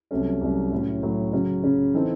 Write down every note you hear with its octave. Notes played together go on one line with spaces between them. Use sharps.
C2 C3 F#3 A3 C#4
C2 C3 F#3 A3 C#4
A2 F#3 C#4
A2 F#3 C#4
C#3 F#3 C#4
C#3 F#3 C#4
E3 C4 D#4 A4